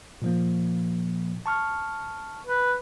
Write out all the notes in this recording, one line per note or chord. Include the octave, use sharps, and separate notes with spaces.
A#2 F3 A#3
A5 C#6 F6
B4